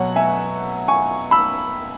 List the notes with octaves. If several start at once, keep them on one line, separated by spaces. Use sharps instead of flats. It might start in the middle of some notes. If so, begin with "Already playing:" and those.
Already playing: B2 F#3 C#5 F#5
E5 G#5
G#5 C#6
B5 E6